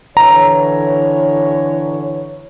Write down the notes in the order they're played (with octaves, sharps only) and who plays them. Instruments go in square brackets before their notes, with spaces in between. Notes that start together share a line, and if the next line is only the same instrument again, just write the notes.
[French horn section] D3 E3 C#5 [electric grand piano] A#5